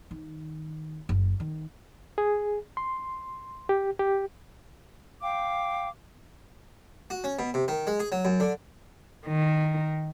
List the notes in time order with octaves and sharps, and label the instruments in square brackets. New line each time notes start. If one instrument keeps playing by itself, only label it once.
[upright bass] D#3
F#1
D#3
[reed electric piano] G#4
C6
G4
G4
[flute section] F5 G5 D6
[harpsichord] F#4
C#4
B2
C3
D#3
G#3
G#4
F#3
F#2
D3
[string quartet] D#3